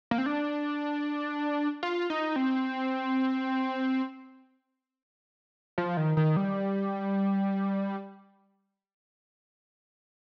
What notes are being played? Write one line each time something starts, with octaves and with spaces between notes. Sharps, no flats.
A#3
C4
D4
F4
D#4
C4
F3
D#3
D#3
G3